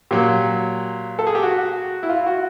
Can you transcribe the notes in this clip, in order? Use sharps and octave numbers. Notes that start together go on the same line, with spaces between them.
A#2 F#3 G4
A4
G#4
G4
F#4
E4
F4
F#4